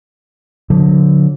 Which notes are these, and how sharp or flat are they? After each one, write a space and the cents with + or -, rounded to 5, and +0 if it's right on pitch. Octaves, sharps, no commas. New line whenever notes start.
D3 -20 F#3 -45